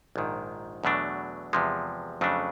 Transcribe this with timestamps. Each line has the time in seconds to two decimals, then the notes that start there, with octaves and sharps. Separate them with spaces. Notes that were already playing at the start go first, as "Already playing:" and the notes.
0.16 A#1 G#2 D#3
0.84 E2 B2 F#3 A3 D4
1.53 E2 C3 F3 G#3
2.21 F2 C#3 F#3 A3 D4